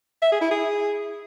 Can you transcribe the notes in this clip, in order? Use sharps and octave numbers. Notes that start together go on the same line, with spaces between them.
E5
G#4
E4
G#4